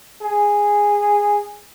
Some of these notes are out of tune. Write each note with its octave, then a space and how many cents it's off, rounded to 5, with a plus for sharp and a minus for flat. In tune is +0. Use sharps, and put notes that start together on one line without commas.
G#4 -10